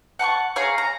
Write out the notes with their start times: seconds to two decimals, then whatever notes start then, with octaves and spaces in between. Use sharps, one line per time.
0.19 F#5 A5 C6 C#6
0.56 G#4 C#5 F5 A#5
0.78 A#5